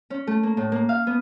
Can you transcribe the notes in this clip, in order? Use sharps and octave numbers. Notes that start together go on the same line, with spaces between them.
C#4
A3
A#3
A2
A#3
F5
B3